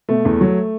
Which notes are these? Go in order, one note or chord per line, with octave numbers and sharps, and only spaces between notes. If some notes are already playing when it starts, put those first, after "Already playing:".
B2 A3
E2
F#3